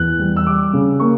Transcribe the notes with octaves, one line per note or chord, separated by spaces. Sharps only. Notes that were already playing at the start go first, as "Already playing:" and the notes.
Already playing: E2 F#6
G3
E6
G3 D6
C#3
A#3 C#6